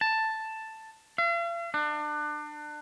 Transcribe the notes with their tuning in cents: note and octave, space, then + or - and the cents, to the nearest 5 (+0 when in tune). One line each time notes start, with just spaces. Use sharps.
A5 +5
F5 -45
D4 +30